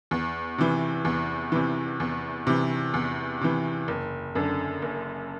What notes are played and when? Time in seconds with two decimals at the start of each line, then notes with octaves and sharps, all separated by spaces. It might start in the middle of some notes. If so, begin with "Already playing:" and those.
0.11 E2
0.58 C3 E3
1.05 E2
1.52 C3 E3
2.00 E2
2.47 C3 E3
2.94 E2
3.41 C3 E3
3.88 F#1
4.35 F#2 D3
4.82 F#1